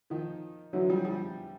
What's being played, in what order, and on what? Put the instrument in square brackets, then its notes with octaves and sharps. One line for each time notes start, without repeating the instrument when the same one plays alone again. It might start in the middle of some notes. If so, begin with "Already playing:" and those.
[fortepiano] D#3 F3
[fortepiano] D3 E3 [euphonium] F#3
[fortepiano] F3 G3
F3 G3